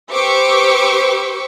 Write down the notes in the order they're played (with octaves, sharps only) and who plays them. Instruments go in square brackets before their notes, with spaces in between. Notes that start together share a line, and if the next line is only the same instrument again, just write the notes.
[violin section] G4 B4 C5 C#6 D6 E6